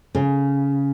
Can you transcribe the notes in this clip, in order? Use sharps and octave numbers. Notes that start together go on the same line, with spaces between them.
C#3